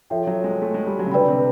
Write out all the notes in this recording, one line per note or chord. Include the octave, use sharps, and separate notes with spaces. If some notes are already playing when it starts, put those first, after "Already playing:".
F3 A4 C#5 E5 G5
F#3
G#3
A3
G#3
G3
F#3
C#3
D3 B4 D5 G5 B5
C3